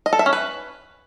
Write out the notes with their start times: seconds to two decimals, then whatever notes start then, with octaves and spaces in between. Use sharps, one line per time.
0.06 D#5
0.13 A4
0.19 E5
0.26 C#4
0.33 B4